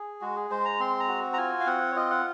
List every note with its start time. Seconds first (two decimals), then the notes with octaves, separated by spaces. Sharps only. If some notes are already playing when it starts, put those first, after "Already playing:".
Already playing: G#4
0.21 G#3 F#4
0.36 G#4
0.50 G#3 C5
0.65 A#5
0.80 C4 C6
1.00 A#5
1.08 F#4
1.33 A#5
1.37 F4 G#5
1.60 F5
1.66 C4 F#5
1.91 C#5
1.95 F4 D#5
2.11 F#5